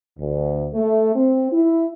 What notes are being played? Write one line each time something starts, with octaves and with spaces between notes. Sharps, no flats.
D2
A3
C4
E4